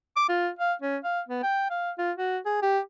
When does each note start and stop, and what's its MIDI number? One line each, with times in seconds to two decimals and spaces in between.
0.16 0.25 86
0.29 0.49 65
0.59 0.73 77
0.82 0.97 61
1.04 1.20 77
1.29 1.43 59
1.43 1.66 79
1.70 1.91 77
1.98 2.12 65
2.17 2.38 66
2.46 2.59 68
2.62 2.79 67